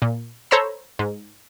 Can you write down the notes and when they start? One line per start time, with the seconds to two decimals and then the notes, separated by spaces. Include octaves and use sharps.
0.02 A#2
0.51 A4 C5 C#5 A#5 B5 E6
0.99 G#2